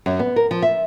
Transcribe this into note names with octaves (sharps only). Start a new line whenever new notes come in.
F#2
B3
A#4
F3
E5